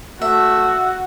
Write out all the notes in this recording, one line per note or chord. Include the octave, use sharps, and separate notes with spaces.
A3 F#4 E5